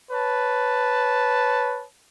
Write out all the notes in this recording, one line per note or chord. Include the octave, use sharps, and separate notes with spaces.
B4 C#5 A5